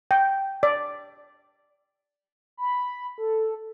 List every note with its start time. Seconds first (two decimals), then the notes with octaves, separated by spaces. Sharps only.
0.11 G5
0.63 D5
2.57 B5
3.18 A4